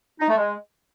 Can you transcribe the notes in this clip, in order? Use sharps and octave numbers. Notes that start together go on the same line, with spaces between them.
D#4
A3
G#3